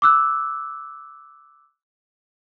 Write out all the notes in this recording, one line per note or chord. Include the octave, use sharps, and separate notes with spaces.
D6 E6 F#6